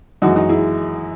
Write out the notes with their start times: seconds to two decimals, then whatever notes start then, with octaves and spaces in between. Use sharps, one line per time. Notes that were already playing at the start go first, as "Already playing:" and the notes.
0.22 F#2 E3 G#3 D#4 F#4
0.36 D#4 F#4
0.49 E4 G#4